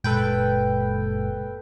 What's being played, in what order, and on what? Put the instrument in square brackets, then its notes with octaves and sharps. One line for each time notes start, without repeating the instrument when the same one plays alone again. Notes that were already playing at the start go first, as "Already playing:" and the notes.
[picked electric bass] F#1 A#2 G#3 [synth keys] A4 B4 G5